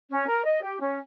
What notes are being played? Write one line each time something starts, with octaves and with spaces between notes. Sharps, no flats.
C#4
A#4
D#5
G4
C#4